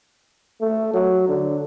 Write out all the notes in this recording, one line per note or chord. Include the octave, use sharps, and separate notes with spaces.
A3
F#3
D3